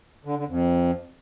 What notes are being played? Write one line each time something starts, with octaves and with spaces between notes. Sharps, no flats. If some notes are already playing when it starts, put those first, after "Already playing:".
D3
D3
F2